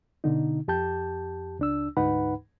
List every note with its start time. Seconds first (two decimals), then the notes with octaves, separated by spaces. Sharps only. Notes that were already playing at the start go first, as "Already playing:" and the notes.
0.24 B2 D3 D#4
0.68 F2 G4 A5 G6
1.59 C#2 D4 E6
1.97 D2 G#2 D#4 B4 F#5 B5